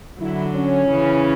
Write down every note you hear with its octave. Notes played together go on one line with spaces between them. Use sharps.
D3 F#3 E4
C#4
C#3 E3